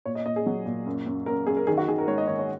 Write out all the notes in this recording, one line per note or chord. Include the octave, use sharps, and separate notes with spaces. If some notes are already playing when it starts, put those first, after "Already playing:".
A#2 C#5
D#5
A#2 D#5
G#4
F#3
A#2
F#2
F#2
F#2 A#4
F#2 G#4
A#4
D#3 G#4
F#4
D#3 G#4
A#4
G#2 C#5
D#5
D#3 C#5
C#5